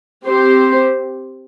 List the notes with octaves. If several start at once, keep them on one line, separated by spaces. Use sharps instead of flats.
C4 G4 C5